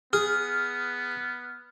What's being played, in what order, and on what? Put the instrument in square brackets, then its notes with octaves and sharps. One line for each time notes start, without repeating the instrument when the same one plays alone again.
[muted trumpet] B3 [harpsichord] G#4 [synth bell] F6